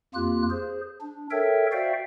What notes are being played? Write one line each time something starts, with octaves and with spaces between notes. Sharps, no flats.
F2 A#3 F4 G4 F#6
G#4 C5
D4
A4 A#4 C#5 E5 G5
F#4 C5 D5 E5 F5 G5